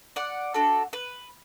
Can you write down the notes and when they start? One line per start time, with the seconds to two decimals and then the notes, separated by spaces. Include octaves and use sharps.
0.16 D5 F#5
0.54 D4 F#4 A4
0.93 B4